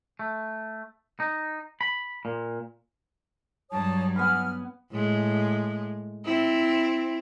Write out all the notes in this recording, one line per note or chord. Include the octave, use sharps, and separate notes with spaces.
A3
D#4
B5
A#2
G2 F#3 C#5 A5 D#6
B3 G#5 B5 F6
A2 G#3
C4 E4